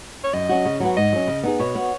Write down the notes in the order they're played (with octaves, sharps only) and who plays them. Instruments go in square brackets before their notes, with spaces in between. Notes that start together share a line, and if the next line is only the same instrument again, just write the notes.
[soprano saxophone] C#5
[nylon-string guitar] F#2 [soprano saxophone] D#5
[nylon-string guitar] F#3 C#4 F#4
C#3
F#3 B3 F#4
[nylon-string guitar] G#2 [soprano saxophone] D#5
[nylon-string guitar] F#3 C#4
C#3
B3 D#4 G#4
[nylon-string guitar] B2 [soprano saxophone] C#5
[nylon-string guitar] B3 F#4